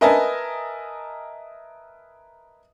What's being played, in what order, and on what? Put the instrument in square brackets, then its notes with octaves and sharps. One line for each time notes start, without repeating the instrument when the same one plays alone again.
[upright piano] A#4 B4 D#5 E5 G#5 A5